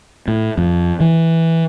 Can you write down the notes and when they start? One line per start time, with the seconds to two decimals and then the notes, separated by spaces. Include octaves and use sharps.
0.28 A2
0.58 F2
1.00 E3